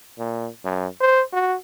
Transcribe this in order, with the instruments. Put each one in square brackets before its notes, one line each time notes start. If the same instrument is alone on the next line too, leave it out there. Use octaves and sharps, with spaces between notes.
[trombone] A#2
F#2
C5
F#4